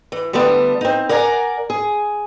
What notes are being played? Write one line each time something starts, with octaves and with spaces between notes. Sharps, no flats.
E3
D3 G3 A3 B3 D4
C4 D#4
A#4 D5 F#5 G#5 A#5
G#4